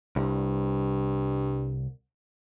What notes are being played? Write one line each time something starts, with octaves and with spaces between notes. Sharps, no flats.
C2 G2